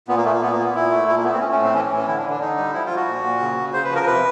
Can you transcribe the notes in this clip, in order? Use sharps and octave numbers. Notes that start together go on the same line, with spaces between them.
A#2 B3
A#3
A#2 A3
A#3
A#2 B3
A#3
A#2
B3
A#2 E4
A3
A#2 E4
A#3
A3 B3
C4
A3 C#4
C#4
A2
C4
E3 C#4
C#4
A2
C#4
D3 E4
D4
D3
D4
D3 D#4
G3
F3 E4
F4
F3
F#4
A#2
A#2
C#3
C#3
C#3 C5
B4
F3
A#4
C3 B4